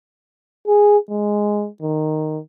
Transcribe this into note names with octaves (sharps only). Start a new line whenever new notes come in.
G#4
G#3
D#3